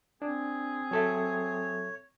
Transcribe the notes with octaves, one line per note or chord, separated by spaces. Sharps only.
C4 D4 G#4
F#3 A4 C#5 E5